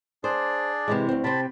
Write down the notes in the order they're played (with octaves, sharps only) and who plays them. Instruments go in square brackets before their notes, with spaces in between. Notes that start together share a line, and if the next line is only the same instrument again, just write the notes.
[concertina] D4 G#4 D5 [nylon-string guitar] C5
[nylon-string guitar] C3 E3 G#3
D2 C4
[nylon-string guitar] C3 C4 [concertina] A5 B5